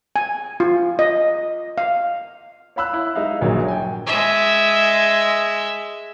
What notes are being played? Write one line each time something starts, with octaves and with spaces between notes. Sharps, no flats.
G#5
F4
D#5
F5
C#5 F5 B5 E6 F#6
E4
G#3 D#4 E5 F5
D#1 A#1 A#2 F#3
G5 G#5
G#3 E5